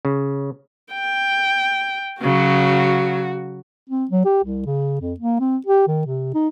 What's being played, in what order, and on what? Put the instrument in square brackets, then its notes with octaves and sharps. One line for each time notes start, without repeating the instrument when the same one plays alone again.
[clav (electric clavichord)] C#3
[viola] G5
[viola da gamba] C#3 F#3 [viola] F#4
[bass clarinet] C4
F#3
G4
C2
C#3
F2
A#3
C4
G4
D#3
C3
D#4